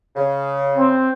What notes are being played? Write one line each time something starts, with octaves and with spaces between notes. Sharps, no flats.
C#3
C4